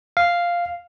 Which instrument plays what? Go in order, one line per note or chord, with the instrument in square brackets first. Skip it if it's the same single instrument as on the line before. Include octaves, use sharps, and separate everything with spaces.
[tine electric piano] F5